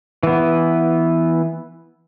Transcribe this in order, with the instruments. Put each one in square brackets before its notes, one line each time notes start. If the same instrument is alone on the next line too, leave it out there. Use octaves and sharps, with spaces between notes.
[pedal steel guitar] E3 B3